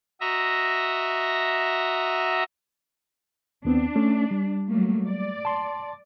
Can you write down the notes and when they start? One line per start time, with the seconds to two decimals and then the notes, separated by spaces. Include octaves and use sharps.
0.21 F#4 D#5 E5 A#5
3.65 D#2 B3 C4 D4
3.96 A3 C#4
4.31 G3
4.68 F#3 A3 A#3
5.06 D5
5.45 A5 C6